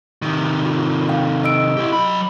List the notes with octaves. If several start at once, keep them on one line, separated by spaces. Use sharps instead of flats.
C3 D#3
F4
F5 G5
D#5 E6 D7
E4 G4
F#3 B5